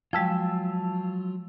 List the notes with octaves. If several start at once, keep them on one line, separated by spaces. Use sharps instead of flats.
F3 F#3 G#3 F4 G5 A5 E6